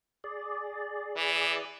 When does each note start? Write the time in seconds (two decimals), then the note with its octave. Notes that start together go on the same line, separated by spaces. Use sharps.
0.24 G#4 D5
1.17 E3